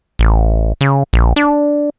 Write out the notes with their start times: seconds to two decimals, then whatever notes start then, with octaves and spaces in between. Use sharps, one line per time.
0.19 A1
0.81 C#3
1.13 A#1
1.36 D4